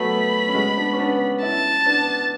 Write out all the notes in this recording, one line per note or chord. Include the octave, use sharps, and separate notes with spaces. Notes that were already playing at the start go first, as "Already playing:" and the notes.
Already playing: F#3 A3 B3 B5
C#4
G#3 B3
B3 D4
C#4
B3 D4
C#4 E4 A5
B3 D4